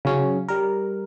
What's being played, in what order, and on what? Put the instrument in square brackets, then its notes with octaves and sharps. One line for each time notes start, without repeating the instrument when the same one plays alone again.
[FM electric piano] C#3 F#3 C#4
G3 A#4